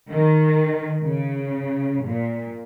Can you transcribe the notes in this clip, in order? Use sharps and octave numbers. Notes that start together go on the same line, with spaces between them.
D#3
C#3
A#2